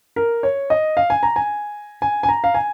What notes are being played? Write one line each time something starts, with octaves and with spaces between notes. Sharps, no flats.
A#4
C#5
D#5
F5
G#5
A#5
G#5
G#5
G#5
A#5
F5
G#5